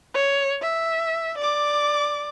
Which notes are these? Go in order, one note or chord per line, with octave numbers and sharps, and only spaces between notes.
C#5
E5
D5 D6